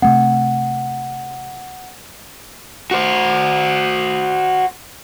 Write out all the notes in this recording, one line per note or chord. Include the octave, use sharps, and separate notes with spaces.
C3 A3 C4 F#5
F#4 C5